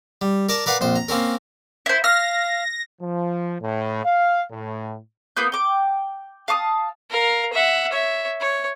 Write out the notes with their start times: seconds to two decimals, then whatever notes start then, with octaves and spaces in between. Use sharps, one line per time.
0.22 G3
0.49 A#4 D5 A5 A#5
0.66 A#4 B4 D5 F5 F#5 B5
0.81 A#1 F2 C5
0.96 A#5
1.08 A#3 C4 C#4 A#4
1.86 E4 C5
2.04 F5 F6 A#6
3.01 F3
3.61 A2
4.05 F5
4.52 A2
5.37 A#3 B3 F4 G6
5.52 G5 D6
6.48 F5 A5 D6 D#6
7.10 A#4 F5
7.53 E5 F#5
7.92 C#5 E5
8.40 C#5